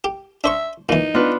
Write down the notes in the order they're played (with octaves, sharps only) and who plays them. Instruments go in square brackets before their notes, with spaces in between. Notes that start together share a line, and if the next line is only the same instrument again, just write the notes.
[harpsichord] G4
[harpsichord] D4 C5 C#6 [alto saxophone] E5
[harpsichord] A#2 E3 [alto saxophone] D#4
[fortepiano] B3 D4 [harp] F4 B4